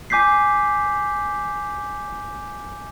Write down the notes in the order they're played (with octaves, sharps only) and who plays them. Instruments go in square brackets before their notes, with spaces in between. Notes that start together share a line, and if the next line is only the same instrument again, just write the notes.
[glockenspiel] G#5 D6 G6 B6 C7